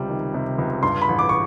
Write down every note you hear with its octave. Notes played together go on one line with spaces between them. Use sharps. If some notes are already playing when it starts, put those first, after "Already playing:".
Already playing: C#2 C3 G3
D#3
C3
C#2
G2 C6
B5
A1
D6
C#6